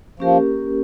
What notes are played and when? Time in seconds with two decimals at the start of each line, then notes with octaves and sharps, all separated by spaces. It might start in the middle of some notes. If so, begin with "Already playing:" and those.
0.20 F3 A#3 C#4 G4 A#4